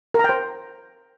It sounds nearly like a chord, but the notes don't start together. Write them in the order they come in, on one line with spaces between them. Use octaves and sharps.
A#4 A#5 G5 C5